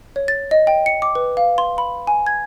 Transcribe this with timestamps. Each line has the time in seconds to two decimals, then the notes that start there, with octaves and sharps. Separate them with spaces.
0.16 C#5
0.28 A6
0.51 D#5
0.67 G5
0.86 C#7
1.02 D6
1.15 B4
1.37 F5
1.58 C6
1.78 B5
2.07 G#5
2.27 G#6